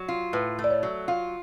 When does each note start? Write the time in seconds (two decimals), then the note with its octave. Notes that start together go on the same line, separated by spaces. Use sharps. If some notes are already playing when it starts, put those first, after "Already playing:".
Already playing: F#3
0.08 F4
0.33 A2 B4
0.59 A3
0.64 D5
0.70 C#5
0.83 F#3
1.08 F4 F5